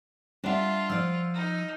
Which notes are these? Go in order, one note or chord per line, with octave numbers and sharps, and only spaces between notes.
G3 D4 F4 D5 E5 F#5
F3 D5 E6 F6
D#4